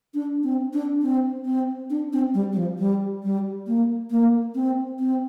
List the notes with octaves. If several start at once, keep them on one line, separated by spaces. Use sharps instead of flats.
D4
C4
D4
C4
C4
D4
C4
G3
G3
F3
G3
G3
A#3
A#3
C4
C4